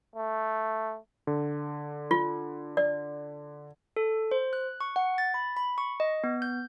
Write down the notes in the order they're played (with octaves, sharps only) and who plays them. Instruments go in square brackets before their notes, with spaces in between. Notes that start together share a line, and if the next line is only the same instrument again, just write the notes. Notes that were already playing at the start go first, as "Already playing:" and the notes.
[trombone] A3
[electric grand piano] D3
[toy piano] F4
D5
[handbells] A4
C5
F#6
C#6
F#5
A6
B5
B5
C#6
D#5
B3
G6